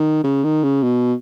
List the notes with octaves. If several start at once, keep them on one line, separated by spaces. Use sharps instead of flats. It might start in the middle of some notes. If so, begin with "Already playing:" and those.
Already playing: D#3
C#3
D#3
C#3
B2